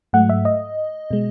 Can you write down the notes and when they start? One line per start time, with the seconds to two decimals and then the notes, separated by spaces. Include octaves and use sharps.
0.13 G#2 F#3 A3 F#5
0.29 E5
0.45 D#5
1.11 B2 G#3